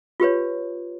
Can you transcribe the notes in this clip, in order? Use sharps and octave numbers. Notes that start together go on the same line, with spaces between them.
F4 G4 B4 C#5